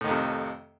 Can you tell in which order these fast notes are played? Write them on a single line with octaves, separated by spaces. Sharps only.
A2 D#3 F2 C3